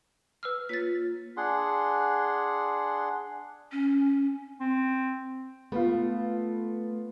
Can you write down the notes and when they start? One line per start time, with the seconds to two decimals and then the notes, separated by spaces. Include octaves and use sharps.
0.43 B4 E6 F6
0.69 A#3 F4 C#5 A6 B6
1.37 D4 G#4 F#5 C6
3.72 C#4
4.60 C4
5.72 A3 B3 F4